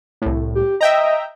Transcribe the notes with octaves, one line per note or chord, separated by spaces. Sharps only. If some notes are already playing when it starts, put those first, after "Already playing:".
C2 A2
G4
D#5 E5 G5 A#5